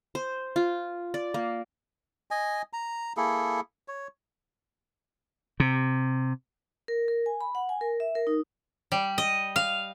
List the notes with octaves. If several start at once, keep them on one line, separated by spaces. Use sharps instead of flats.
C5
F4
D5
A#3
D#5 G#5
A#5
A#3 E4 G#4 A4
C#5
C3
A#4
A#4
G#5
B5
F#5
G#5
A#4
E5
A#4
D#4
G3
D#5
F5